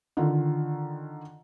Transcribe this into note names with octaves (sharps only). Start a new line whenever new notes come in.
D3 D#3 F4